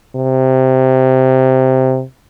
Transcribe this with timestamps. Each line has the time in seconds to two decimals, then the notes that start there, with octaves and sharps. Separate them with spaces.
0.16 C3